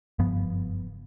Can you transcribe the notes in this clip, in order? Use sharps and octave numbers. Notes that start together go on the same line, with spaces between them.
F#1 G2 F3 B3